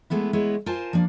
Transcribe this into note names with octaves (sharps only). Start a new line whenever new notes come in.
G#3 A3 B3 E4
G#3 B3 E4 C#5
F4 A#4 C5 G#5 A5
F3 A#3 D4